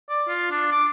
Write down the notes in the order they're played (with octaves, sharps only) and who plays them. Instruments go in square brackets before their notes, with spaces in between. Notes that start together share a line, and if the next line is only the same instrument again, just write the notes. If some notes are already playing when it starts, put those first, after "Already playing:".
[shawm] D5
F4
D4
D6